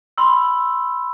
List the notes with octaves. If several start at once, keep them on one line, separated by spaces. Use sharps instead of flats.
B5 C6 E6